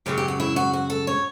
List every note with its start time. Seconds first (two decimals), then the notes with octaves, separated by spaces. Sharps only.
0.06 F#2 C#3 F#3 G4
0.18 G4
0.28 F#4
0.40 E4
0.56 F#4
0.73 F#4
0.90 A4
1.07 C#5